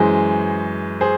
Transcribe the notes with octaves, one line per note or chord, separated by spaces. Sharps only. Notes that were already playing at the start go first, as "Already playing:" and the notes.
Already playing: F#2 E3 G#3 G#4 C5
G#4 C5